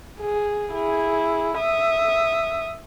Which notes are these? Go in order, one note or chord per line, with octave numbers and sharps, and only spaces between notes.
G#4
E4 G#4
E5 D#6